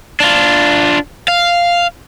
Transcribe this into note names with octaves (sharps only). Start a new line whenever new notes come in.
D4 F4
F5